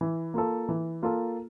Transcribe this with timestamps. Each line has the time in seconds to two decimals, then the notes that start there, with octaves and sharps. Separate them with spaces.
0.01 E3
0.34 A#3 F4 A4
0.69 E3
1.02 A#3 F4 A4